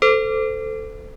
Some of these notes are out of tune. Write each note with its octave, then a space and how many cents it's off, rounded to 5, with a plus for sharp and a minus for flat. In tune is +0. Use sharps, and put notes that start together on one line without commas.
A4 +0 C5 -25